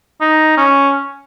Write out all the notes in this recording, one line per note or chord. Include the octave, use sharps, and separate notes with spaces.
D#4
C#4